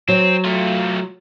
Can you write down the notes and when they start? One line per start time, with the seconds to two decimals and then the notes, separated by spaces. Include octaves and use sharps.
0.09 F#3 C4
0.45 A3 F4